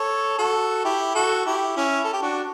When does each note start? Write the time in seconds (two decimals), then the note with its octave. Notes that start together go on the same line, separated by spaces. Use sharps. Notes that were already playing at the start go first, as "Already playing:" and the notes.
Already playing: A4 C#5
0.38 F#4 A4
0.85 E4 G4
1.15 F#4 A4
1.46 E4 G4
1.76 C#4 E4
2.04 A4
2.13 G4
2.22 D4 F#4